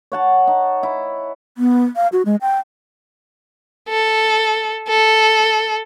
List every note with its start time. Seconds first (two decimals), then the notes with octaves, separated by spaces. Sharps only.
0.12 C#5 F#5 A5
0.47 D#4
0.83 E4
1.58 B3
1.96 F5
2.12 F#4
2.25 G#3
2.41 G5
3.89 A4
4.88 A4